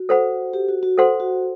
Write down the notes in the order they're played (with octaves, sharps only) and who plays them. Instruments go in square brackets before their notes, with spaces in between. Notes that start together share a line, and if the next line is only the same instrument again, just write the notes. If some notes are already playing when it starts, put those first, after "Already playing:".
Already playing: [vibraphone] F#4
[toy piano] A4 C5 F#5 B5
[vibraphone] G4
F#4
F#4
[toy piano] A4 C5 F#5 C6
[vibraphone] F#4